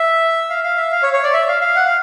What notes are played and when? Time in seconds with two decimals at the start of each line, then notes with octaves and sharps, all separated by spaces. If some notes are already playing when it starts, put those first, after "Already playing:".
Already playing: E5
0.50 F5
0.63 F5
0.77 E5
0.92 F5
1.03 C#5
1.13 C#5
1.23 D5
1.33 E5
1.48 F5
1.61 F5
1.76 F#5
1.86 F5